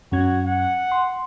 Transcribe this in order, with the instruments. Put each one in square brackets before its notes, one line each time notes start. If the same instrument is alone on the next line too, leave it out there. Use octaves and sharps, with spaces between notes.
[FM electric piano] F#2 C#4 G#6 [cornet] F#4
[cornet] F#5
[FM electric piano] C6